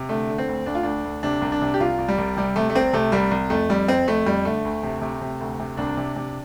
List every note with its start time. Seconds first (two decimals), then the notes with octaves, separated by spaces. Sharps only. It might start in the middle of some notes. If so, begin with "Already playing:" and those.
Already playing: C3
0.09 D3 A3
0.29 D3
0.38 C4
0.48 D2
0.66 D2 D4
0.75 F4
0.83 D2 D4
1.05 D2
1.23 C3 D4
1.42 C2
1.52 D4
1.61 C3
1.74 G4
1.80 C2 F4
1.98 C2
2.08 G3
2.18 C2
2.37 C3 G3
2.56 C3 A3
2.70 A3
2.75 C2 C4
2.93 C3 A3
3.12 C2 G3
3.31 C2
3.50 F2 A3
3.69 F2 G3
3.88 F2 C4
4.07 F2 A3
4.26 F2 G3
4.45 D3 A3
4.65 D2
4.83 C3
5.01 C3
5.21 C3
5.40 D2
5.59 C3
5.77 C2 D4
5.97 C3
6.16 C3